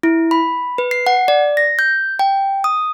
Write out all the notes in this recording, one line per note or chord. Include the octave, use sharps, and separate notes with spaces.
E4
B5
B4
C7
F#5
D5
A#6
G6
G5
D#6